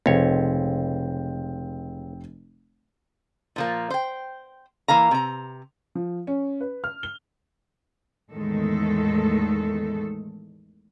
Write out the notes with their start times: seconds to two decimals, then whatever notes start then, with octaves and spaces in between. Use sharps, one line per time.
0.06 F1 C#2 C4 C#5
3.56 A#2 F3 A#3
3.90 C5 G5
4.88 E3 A#3 F5 A#5
5.11 C3 A#5
5.95 F3
6.27 C#4
6.61 B4
6.84 F6
7.03 G7
8.32 E2 A2 D#3 G#3 A3 A4